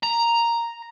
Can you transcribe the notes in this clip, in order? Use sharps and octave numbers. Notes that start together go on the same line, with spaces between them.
A#5